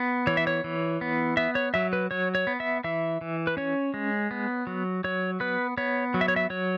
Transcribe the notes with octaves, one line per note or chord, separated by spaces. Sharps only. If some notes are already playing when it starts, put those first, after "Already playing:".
Already playing: B3
E3 C#5
E5
C#5
E3
B3
B3 E5
C#5
F#3 E5
B4
F#3 C#5
C#5
B3
E5
E3 E5
E3
B4
C#4 C#5
G#3
B3
F#3
F#3 C#5
B3 B4
B3 C#5
F#3
E5
C#5
E5
F#3 C#5